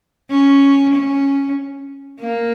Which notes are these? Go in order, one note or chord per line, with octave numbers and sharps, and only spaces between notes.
C#4
C#4
A#3